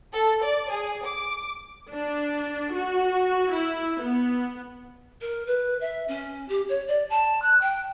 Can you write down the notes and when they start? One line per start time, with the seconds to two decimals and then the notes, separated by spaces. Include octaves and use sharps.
0.13 A4
0.43 D5
0.72 G#4
1.05 D6
1.91 D4
2.74 F#4
3.54 E4
4.03 B3
5.21 A#4
5.46 B4
5.80 E5
6.08 C#4
6.48 G4
6.68 C#5
6.87 D5
7.09 A5
7.41 F#6
7.61 G5